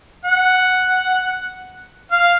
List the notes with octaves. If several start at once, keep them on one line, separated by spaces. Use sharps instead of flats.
F#5
F5